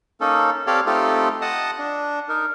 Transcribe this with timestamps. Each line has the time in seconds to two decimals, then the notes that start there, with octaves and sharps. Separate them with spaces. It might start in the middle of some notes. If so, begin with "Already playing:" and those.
0.21 A#3 C#4 D#4 A4
0.67 C4 G4 A4 C#5 D5 F5
0.86 A3 C4 D#4 F4 G4 A4
1.41 D#5 F#5 A5 D#6
1.78 D4
2.29 D#4 A#4